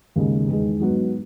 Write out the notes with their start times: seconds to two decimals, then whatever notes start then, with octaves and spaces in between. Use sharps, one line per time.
0.16 D#2 C#3 G#3
0.48 E2 D#3 G#3
0.80 G#2 F#3 B3